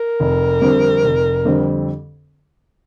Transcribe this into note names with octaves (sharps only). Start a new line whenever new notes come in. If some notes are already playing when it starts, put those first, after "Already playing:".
Already playing: A#4
F1
F2 D3 G3 C4
F1
F2 D3 G3 C4